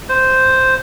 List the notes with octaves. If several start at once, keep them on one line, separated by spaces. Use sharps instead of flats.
C5